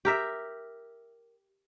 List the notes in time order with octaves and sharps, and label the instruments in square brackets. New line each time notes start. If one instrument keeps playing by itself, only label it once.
[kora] G4 A#4 E5